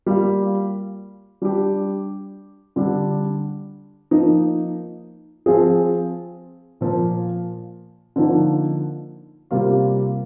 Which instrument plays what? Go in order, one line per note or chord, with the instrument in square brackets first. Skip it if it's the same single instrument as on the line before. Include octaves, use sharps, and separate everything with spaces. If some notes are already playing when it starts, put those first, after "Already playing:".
[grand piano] G3 A#3 F4
G3 D4 G4
D3 G3 D4
F3 A#3 D#4
F3 C4 F4 G#4
A#2 F3 A#3
D3 F3 A#3 D#4
C3 G3 A#3 F4